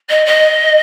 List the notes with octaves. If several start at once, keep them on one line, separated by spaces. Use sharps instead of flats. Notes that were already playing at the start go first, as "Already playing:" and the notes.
D#5
D#5